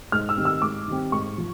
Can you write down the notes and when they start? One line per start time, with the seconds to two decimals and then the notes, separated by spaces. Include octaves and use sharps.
0.12 G#2 F6
0.29 E6
0.37 D#3 G3 C4
0.45 E6
0.62 G#2 D6
0.88 D#3 G3 C4
1.12 G#2 C#6
1.38 F3